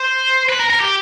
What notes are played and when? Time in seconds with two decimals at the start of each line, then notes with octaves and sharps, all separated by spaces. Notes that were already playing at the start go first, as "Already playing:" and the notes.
Already playing: C5
0.49 B4
0.59 A#4
0.70 A#4
0.80 G4